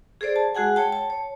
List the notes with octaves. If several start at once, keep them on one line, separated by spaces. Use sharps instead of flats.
G#4 A4 C5 D5
A5
G#3 F#4 G#4 F#5 G#5
C#5 G5 A5
A5
C#5